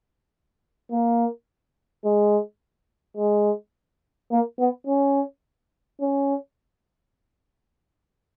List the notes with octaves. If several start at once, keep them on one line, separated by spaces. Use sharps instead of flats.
A#3
G#3
G#3
A#3
B3
C#4
C#4